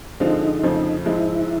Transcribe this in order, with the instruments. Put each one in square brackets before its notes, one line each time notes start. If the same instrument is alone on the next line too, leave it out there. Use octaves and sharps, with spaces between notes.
[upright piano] D3 F3 G#3 C4 F4 [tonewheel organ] D#4
[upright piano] F2 C#3 F3 A3
[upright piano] G#2 F3 G#3 [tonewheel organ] E4